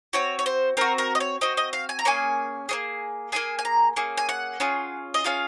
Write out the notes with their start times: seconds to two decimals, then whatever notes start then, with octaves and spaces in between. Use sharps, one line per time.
0.13 C4 F#4 C#5
0.39 C#5
0.46 C5
0.77 C4 F#4 A#4
0.98 A#4
1.15 D#5
1.20 C#5
1.41 C4 F#4 D#5
1.57 D#5
1.73 F5
1.89 G#5
1.99 A#5
2.05 A#3 C#4 G#4 G#5
2.69 A#3 C#4 G#4
3.32 A#3 C#4 G#4 G#5
3.59 G#5
3.65 A#5
3.96 A#3 C#4 G#4
4.17 G#5
4.29 F#5
4.60 C#4 F4 G#4
5.14 D#5
5.24 C#4 F4 G#4 F5